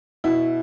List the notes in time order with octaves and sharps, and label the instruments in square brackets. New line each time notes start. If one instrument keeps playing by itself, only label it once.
[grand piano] B2 E4